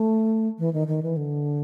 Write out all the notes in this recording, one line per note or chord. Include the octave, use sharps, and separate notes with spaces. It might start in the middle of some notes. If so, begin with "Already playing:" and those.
Already playing: A3
E3
D#3
D#3
E3
D3